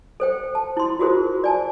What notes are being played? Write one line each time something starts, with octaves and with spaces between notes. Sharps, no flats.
A4 C5 G5
A5
E4 C6
F4 F#4 G#4 A#4 C5
D5 G#5 A5